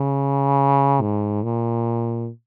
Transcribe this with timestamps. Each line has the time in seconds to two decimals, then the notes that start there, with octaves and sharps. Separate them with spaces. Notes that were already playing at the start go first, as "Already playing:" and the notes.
Already playing: C#3
1.02 G#2
1.43 A#2